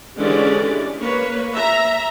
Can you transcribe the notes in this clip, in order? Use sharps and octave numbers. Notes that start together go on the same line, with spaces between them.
D3 E3 G#3 C#4 G4 D5
A#3 B4 C#5
E5 A#5